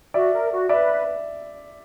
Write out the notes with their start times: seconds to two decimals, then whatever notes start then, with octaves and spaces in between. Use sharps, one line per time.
0.14 F#4 D5 E5
0.33 A#4
0.51 F#4
0.69 B4 D5 E5